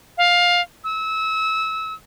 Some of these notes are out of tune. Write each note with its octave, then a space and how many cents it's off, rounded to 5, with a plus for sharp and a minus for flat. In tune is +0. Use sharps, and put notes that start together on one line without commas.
F5 +15
E6 -25